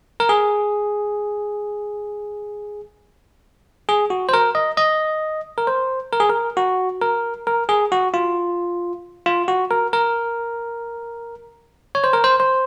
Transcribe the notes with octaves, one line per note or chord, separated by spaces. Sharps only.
A#4
G#4
G#4
F#4
C5
A#4
D#5
D#5
A#4
C5
A#4
G#4
A#4
F#4
A#4
A#4
G#4
F#4
F4
F4
F#4
A#4
A#4
C#5
C5
A#4
C5
C5